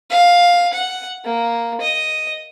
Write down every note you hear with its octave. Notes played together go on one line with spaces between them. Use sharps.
F5
F#5
A#3
D#5